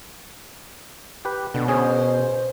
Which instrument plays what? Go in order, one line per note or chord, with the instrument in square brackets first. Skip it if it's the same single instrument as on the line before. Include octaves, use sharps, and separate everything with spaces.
[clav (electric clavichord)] G4 B4
[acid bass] B2 [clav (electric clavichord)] D3
[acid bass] B2 [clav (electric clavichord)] C#4 G#4 [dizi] C5